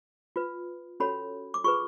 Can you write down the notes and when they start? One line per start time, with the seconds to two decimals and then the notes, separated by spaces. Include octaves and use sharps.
0.36 F4 B4
1.00 C#4 F#4 A4 C#5 B5
1.54 D6
1.64 F4 G#4 B4 C#6